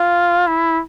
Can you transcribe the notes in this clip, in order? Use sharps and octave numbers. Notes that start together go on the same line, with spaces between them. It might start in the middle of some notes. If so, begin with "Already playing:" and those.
Already playing: F4
E4